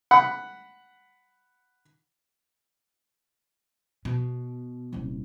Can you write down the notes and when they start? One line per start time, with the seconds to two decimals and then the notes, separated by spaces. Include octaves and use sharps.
0.11 F#5 B5
4.05 B2
4.93 D#1 C2